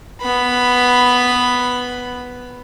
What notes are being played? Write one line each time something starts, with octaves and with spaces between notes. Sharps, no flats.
B3 B5